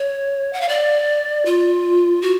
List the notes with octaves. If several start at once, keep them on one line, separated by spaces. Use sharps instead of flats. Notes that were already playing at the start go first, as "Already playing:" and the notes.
Already playing: C#5
F#5
F5
D5
F4
F#4